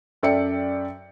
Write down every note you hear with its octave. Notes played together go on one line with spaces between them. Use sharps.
F#2 A4 D5 E5 G5 C#7